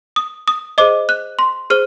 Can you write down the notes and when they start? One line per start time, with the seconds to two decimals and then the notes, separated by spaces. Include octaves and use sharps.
0.16 D#6
0.48 D#6
0.78 G#4 C5 D#5 D6
1.09 F#6
1.39 C6
1.70 G#4 C5 F6